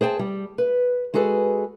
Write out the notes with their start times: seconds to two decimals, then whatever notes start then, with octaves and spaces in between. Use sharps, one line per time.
0.01 G#4 C5 G5 A5
0.19 G3
0.58 B4
1.14 G#3 F#4 G#4 A4 B4